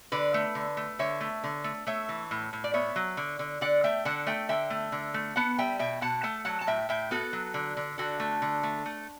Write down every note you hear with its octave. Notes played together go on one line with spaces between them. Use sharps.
D3 B4 D5
A3
D3
A3
D3 C#5 E5
A3
D3
A3
A3 C#5 E5
E3
A2
A2
D5
B3 C#5 E5
F#3
D3
D3
D3 D5 F#5
A3 E5 G5
D3 F#5 A5
A3 E5 G5
D3 E5 G5
A3
D3
A3
B3 F#5 A5
G3 E5 G5
B2 E5 G5
B2 F#5 A5
A3 F#5 A5
F#3 F#5 A5
A5
A2 E5 G5
A2 E5 G5
B3 F#4 A4
F#3
D3
D3
D3 F#4 A4
A3
D3
A3
A3